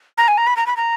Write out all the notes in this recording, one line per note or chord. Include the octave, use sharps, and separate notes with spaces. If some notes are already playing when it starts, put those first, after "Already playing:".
A#5
G#5
A#5
B5
A#5
B5
A#5